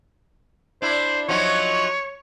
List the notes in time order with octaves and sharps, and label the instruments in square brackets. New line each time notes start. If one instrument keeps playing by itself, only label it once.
[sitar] D4 E4 [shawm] C5
[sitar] F3 F#3 D#4 [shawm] C#5